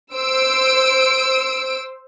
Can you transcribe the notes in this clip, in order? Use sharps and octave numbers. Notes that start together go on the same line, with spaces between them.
C5 E6 D7